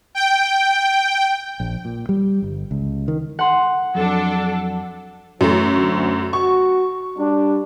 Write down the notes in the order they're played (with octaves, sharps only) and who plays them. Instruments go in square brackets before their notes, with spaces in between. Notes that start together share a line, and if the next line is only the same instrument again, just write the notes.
[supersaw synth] G5
[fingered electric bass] A#1
A#2
G3
G1
C#2
D#3
[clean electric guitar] A4 [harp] F#5 C6
[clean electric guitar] F2 F#3 [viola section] D4 A4
[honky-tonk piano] F#2 A3 [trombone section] E3
[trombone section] D2
[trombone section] F#4 [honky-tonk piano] C#6
[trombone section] G3 D4